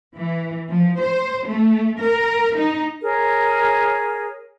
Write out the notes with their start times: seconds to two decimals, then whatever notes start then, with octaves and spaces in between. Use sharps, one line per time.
0.17 E3
0.70 F3
1.02 C5
1.48 A3
2.02 A#4
2.58 D#4
3.03 G#4 A#4 C#5